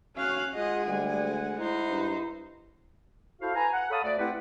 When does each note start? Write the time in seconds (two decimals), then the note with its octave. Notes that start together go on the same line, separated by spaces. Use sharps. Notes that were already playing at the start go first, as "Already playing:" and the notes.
0.16 C#4 F#4 C#5 F5 F#6
0.55 G#3 F4 G#4 D#5 F#5
0.87 D2 G3 G#5
1.58 D#4 E4 C5
1.90 G2
3.41 E4 F#4 A4 C5 F5
3.55 B4 G#5 A#5
3.73 F#5
3.91 A4 C#5 F5 A5 B5 D#6
4.03 D2 D5
4.19 A3 C4 E4 G4 B4 F#5